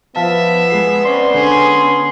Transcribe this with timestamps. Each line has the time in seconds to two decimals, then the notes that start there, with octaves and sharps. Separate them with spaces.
0.16 F3 B3 E5 F5 A5
0.70 G#3 G#4 C7
1.05 C4 C#4 D5 C6
1.34 D3 C#4 G#4